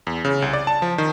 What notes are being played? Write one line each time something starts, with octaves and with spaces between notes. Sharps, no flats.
E2
C#3
C2
D5
A5
F3
D#3